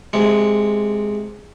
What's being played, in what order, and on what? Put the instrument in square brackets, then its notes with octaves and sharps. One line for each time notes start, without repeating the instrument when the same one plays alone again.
[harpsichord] C3 G#3